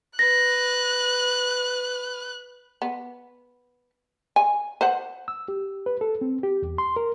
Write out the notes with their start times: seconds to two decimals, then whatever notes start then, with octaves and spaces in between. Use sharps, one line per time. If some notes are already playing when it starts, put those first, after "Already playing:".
0.19 B4 F#6 A#6
2.82 B3
4.36 G#5
4.81 B4 C5 F#5
5.28 E6
5.48 G4
5.86 B4
6.01 A4
6.21 C4
6.43 G4
6.62 E2
6.78 C6
6.96 A#4